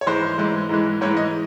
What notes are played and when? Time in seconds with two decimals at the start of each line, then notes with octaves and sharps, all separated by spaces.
0.01 C#5
0.06 G#2 E3 G#3 C5
0.38 G#2 E3 G#3
0.69 G#2 E3 G#3
1.01 G#2 E3 G#3 C#5
1.17 D#5